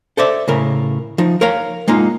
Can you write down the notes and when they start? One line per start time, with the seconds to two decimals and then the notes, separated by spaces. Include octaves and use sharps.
0.17 A4 C5 D5 E5
0.48 A2 C#3 A#4
1.18 F3 D#4
1.41 A#4 C#5 F5 A#5
1.88 G#3 A#3 D#4 F4